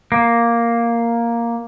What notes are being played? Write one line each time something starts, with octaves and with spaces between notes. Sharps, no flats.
A#3